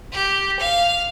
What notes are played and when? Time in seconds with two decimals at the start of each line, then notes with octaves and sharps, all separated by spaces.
0.12 G4
0.60 F5